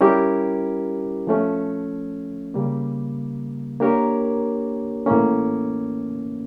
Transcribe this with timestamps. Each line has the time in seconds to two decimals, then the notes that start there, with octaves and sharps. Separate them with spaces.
0.01 G3 C#4 E4 G4 A#4
1.27 F3 A3 C#4
2.54 C#3 G3 A#3
3.80 A#3 D4 G4 A#4 C#5
5.06 A2 E3 A#3 C#4